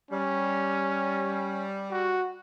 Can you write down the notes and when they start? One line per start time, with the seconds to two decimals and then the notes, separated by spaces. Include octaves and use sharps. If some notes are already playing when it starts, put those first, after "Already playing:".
0.11 G3 C#4
1.91 F#4